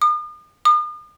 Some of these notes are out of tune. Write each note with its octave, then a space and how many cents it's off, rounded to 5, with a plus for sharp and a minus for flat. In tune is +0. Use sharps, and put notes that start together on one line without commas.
D#6 -45
D#6 -45